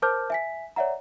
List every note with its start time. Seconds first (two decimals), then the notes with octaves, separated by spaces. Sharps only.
0.02 A#4 C5 A5 D6 F6 G6
0.30 E5 G#5 B6
0.76 C#5 D5 E5 F#5 A#5